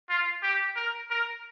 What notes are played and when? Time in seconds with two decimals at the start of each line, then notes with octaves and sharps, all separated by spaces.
0.10 F4
0.43 G4
0.76 A#4
1.10 A#4